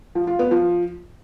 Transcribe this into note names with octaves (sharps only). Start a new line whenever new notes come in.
F3
F4
B3
F3